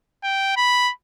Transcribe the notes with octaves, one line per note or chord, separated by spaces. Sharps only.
G5
B5